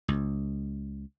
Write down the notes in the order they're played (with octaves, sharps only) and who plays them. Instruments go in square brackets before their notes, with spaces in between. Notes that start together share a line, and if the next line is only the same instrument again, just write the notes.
[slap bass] C#2